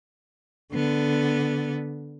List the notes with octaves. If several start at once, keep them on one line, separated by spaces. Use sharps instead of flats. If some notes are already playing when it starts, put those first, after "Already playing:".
D3 B3